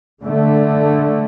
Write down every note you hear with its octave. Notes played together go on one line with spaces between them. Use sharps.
D3 A3